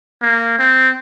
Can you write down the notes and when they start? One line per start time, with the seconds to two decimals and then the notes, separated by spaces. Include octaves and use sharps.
0.22 A#3
0.59 C4